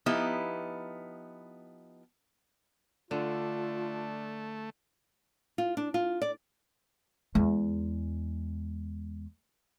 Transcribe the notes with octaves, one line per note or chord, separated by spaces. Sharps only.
F3 B3 D#4 E4 G4
D3 A3 D4 F4
F4
D4
F4
D5
E2 G#3